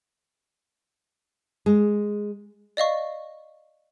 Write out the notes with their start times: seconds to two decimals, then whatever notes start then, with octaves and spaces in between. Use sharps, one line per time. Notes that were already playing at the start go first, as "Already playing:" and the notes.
1.66 G#3
2.77 D5 D#5 F5 C#6